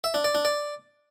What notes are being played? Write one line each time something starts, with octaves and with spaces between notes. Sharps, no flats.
E5
D4
D5
D4
D5